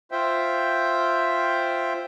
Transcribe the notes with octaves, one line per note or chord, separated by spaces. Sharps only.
F4 C5 E5 G5